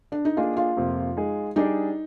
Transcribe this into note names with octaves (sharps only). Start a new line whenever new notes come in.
D4
D#4
A#3 D4 F4 G#4 D#5
F4
F2 C3 F3 A#3
G#3 D#4 G#4
G3 D4 D#4 G#4 D5